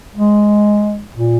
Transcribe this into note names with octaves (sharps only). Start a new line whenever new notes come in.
G#3
A#2